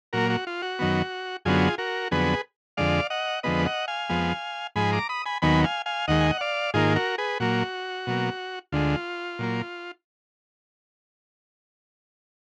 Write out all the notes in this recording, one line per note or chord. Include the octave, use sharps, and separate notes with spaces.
A#2 F#3 A#3 F#4 A#4
F#4
F4
F#4
F#2 D#3 F#3 B3
F#2 D3 F#3 B3 F4 G#4
F#4 A#4
F2 D3 F#3 B3 G#4 B4
F2 D3 G#3 D5 F5
D#5 F#5
F2 D3 F3 G#3 B3 B4 D#5
D#5 F#5
F5 G#5
F2 F3 G#3 B3
G#2 F3 G#3 G#5 B5
A#5 D6
B5 D#6
G#5 B5
D#2 D#3 F#3 B3 G#5 B5
F5 G#5
F5 G#5
D#2 D#3 G#3 D#5 F#5
G#5
F#5
D5 F5
G#2 D#3 A#3 F4 G#4
F#4 A#4
G#4 B4
A#2 F#3 A#3 F#4
B2 F#3 A#3
D2 D3 G#3 F4
A#2 F#3 A#3